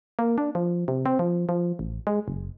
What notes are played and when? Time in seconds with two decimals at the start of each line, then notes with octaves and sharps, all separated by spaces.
0.19 A#3
0.38 D4
0.55 F3
0.88 C3
1.06 C4
1.19 F3
1.49 F3
1.79 A1
2.07 G#3
2.28 F#1